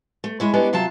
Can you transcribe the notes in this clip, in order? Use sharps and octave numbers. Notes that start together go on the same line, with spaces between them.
A3
G#3 E4 C#5
G#3 B3 C#4 D4 G4 B4
C3 F#3 F4 A5